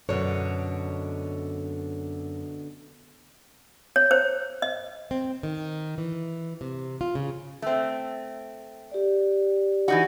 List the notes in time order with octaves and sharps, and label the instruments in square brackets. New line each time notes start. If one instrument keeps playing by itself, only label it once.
[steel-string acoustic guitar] F#2 C#5 [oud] B2 D3
[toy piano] C#5
C5
D#5
[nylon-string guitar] C4
D#3
E3
C3
F4
C#3
[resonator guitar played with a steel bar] A3 C4
[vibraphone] G4 D5
[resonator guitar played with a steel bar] E3 D#4 F#4